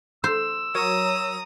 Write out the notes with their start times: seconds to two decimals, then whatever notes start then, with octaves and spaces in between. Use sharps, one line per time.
0.24 C5 E6
0.75 F#3 A#4 C#5 A#5 D#6